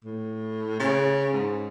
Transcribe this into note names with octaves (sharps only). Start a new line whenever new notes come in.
A2
C#3
G#2